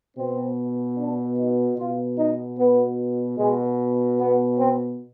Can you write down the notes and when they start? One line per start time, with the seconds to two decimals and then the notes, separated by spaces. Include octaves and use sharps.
0.17 B2 C4
0.97 D4
1.38 D#4
1.78 B2 F4
2.18 D#4
2.59 B3
3.38 B2 G#3
4.19 B3
4.58 C4